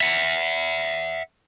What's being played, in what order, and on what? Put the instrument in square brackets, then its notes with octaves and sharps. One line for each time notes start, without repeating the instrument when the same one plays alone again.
[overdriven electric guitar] E5 F#5